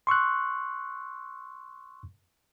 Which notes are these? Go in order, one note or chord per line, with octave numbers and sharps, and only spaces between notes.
C6 C#6 E6 F#6